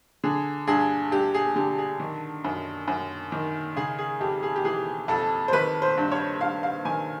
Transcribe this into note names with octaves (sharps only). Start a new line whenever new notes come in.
D3 G#4
G2 G#4
G2 G4
G#4
D3 G4
G#4
D#3
F#2
F#2
D#3
C#3 G#4
G#4
F2 G4
G#4
G4
E3 G#4
F2 A4
C5
D#3 B4
C5
G2
C#5
G2 F5
F5
D#3 G#5